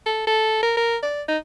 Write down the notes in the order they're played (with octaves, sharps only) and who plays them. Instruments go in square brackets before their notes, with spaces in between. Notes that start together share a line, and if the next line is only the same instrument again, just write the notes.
[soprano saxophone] A4
A4
A#4
A#4
D5
D#4